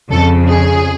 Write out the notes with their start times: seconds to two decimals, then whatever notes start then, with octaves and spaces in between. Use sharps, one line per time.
0.11 F2 C#3 A4
0.48 G#4